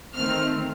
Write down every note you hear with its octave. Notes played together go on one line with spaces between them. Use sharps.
D#3 A3 C4 F6